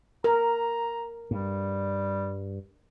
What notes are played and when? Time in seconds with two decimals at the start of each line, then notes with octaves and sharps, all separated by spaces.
0.24 A#4 A#5
1.31 G2 G3